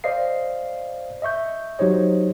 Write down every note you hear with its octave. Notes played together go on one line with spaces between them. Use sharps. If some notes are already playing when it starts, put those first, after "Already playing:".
C5 D5 D#5 F5 C7
D#5 E5 C#6 G6
F#3 D#4 G4 C5 C#5 D#5